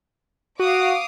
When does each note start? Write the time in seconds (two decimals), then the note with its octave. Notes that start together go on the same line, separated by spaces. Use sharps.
0.59 F#4 F5 D6 D#6